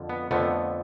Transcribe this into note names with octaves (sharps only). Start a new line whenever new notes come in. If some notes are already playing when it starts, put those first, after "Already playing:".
Already playing: F2 D3 F3
B3
F2 D3 F3 A3 B3